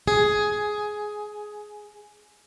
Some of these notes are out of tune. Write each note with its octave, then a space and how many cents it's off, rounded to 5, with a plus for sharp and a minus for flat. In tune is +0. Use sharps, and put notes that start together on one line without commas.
G#4 +10